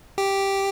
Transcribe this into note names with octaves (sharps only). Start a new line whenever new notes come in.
G4